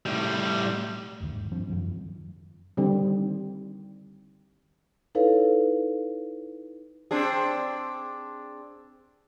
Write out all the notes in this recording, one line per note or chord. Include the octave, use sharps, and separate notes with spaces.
A2 G3
F#1 D#2 D#3
G#2
G2 F3 C4 D4
F#2 D#3 F3 F#3
D3 D#3 G3 C4
D#4 E4 A4 B4 C#5 F5
C4 D4 G#4